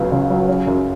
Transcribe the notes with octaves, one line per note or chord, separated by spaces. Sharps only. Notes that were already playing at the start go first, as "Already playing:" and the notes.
Already playing: C#2 C#3 F#3 B3
C#3
F#3
C#4
F#2